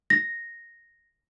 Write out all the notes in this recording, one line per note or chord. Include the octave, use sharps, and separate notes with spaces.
A#6